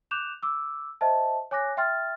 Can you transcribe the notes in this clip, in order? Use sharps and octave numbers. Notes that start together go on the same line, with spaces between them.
D6 F#6 G6 E7 F7
D6 E6
C5 D#5 E5 A5
C#5 G#5 D6 F#6 A#6
E5 G5 C6 F6 A6